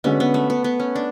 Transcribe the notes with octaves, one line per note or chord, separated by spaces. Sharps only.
D3 G#3 B3 C#4 F#4
B3
A3
B3
B3
C#4
D4